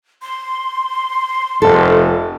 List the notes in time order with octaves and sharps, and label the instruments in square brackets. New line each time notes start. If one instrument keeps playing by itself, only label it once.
[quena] C6
[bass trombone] F1 [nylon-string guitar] A4